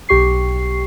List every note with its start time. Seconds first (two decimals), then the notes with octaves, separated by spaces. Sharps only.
0.09 B1 G4 C#6 C7